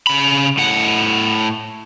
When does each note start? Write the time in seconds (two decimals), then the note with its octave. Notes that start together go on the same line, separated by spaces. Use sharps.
0.07 C#3 B5
0.58 A2 F#5